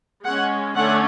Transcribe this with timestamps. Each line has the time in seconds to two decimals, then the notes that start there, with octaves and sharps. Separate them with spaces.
0.25 G#3 C#4 F#5
0.76 D3 A3 C#4 F#5